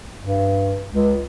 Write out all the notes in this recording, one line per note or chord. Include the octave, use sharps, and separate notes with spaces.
G2
C#2